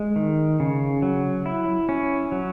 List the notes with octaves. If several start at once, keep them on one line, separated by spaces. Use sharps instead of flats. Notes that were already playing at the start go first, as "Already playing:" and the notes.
Already playing: G#3
D#3
C#3
F#3
E4
C#4
F#3